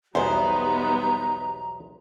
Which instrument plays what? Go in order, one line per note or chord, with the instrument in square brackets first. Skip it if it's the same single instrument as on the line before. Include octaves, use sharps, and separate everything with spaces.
[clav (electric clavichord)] B1 E2 [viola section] G3 B3 D#4 [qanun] C5 [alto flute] A#5